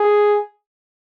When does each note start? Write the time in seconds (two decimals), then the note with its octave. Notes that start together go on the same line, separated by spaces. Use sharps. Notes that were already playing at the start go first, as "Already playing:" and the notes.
Already playing: G#4